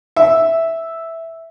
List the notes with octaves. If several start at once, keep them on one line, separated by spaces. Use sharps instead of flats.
E5